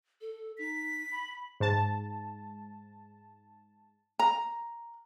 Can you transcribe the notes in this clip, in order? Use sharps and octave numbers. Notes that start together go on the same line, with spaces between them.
A4
D#4 B6
B5
G#2 A5
A#5